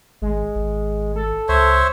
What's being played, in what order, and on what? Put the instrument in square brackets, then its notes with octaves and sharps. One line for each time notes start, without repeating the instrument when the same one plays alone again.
[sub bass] G#1 [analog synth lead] G#3
[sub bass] G#1
[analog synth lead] A4
[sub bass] C#2 [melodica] C5 C#5 E5